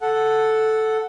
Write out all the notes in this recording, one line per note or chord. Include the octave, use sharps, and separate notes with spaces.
A4 F#5